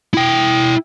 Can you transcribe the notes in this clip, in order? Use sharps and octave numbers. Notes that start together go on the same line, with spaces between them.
E4 G5